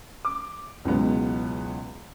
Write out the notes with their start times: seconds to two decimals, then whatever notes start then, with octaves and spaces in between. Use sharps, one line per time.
0.25 D6
0.85 C#2 B2 E3 F#3 G#3 B3